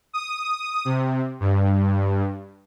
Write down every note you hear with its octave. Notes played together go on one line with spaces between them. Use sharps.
D#6
C3
G2